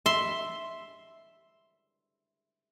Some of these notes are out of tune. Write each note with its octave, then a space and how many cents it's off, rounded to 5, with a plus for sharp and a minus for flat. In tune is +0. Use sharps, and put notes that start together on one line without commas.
E5 +0 C6 +0